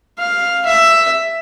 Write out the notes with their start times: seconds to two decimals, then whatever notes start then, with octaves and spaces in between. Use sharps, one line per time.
0.18 F5
0.66 E5